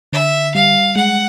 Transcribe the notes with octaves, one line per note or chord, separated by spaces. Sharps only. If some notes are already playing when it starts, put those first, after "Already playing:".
D3 E5
G3 F5
G#3 F#5